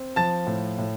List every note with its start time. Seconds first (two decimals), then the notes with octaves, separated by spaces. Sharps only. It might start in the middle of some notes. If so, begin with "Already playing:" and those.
Already playing: C4
0.16 F3 A5 A6
0.47 A2
0.78 A2